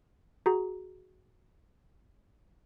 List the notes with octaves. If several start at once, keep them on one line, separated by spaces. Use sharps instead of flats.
F#4 G#4 A#5